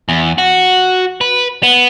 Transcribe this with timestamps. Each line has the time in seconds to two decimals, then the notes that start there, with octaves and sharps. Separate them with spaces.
0.09 E2
0.38 F#4
1.21 B4
1.63 B3